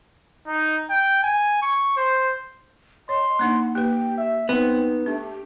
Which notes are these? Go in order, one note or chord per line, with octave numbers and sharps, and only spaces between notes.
D#4
G5
G#5
C#6
C5
C#5 D#5 C6
A#3 D4 D#4 F#5
A#3 G4 B4 G5
E5
B3 C4 D#4
A3 D4 G4